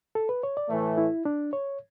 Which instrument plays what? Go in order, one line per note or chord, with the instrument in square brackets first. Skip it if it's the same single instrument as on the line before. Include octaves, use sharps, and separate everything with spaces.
[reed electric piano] A4
B4
C#5
D5
[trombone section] A2 E3 A3
[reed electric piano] E4
D4
C#5